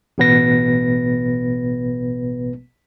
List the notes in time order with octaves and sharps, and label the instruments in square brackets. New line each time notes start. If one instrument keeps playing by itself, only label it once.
[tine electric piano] A1 B2 B3 B4 A#6